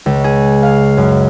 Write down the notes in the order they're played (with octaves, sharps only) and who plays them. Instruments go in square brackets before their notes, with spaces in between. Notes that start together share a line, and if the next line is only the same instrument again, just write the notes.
[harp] C#2
G#4
F5
F#2